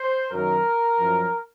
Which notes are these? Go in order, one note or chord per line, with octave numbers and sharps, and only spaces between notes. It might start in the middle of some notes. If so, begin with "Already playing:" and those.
Already playing: C5
F#2 D#3 F#3 A#4
F#2 F3